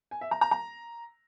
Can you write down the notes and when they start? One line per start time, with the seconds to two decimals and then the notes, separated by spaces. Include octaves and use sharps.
0.11 G#5
0.21 E5
0.31 A#5
0.41 A#5
0.51 A#5